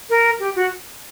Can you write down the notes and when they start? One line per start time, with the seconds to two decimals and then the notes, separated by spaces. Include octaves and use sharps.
0.10 A#4
0.40 G4
0.55 F#4